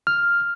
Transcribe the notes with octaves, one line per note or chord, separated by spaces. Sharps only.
F6